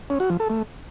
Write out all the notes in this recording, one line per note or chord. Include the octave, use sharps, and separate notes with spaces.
C#4
F#4
F3
A4
A3